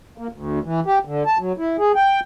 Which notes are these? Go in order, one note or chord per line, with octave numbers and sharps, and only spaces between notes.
A#3
D2
E3
G4
D3
A5
F#3
E4
G#4
G5